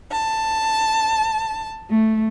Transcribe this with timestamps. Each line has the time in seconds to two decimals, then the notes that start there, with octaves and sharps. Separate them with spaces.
0.11 A5
1.90 A3